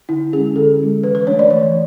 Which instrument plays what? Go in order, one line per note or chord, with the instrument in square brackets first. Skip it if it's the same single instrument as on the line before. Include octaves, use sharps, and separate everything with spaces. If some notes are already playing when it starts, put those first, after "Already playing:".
[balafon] D3 E4
G#3 C#4 G#4
D3 A4
G#3 C#4
E3 B4
B4
A3 D4 C#5
D5
E3 C#5